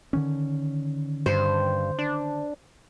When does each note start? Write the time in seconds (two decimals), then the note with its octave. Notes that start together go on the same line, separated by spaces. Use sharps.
0.13 D3 D#3 C#4
1.26 G2 C5
1.99 D4